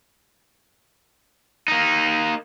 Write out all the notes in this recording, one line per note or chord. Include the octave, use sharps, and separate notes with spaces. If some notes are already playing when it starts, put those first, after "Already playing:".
A#3 D#4